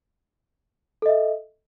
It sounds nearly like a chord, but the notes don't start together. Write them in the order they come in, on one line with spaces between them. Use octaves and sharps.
A4 D#5 E5